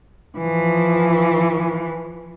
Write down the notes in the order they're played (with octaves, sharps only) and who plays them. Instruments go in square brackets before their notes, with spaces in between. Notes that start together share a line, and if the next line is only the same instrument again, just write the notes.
[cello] E3 F3